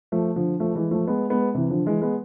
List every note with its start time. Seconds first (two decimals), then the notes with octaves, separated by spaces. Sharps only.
0.12 F3 A3
0.36 D3 F3
0.60 F3 A3
0.75 E3 G#3
0.91 F3 A3
1.07 G#3 B3
1.30 G#3 B3
1.55 C3 E3
1.70 D3 F3
1.86 E3 G#3
2.02 G#3 B3